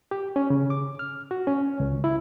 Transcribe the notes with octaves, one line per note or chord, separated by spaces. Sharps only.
G4
C#4
C#3
D6
F6
F#4
C#4
C#2
E4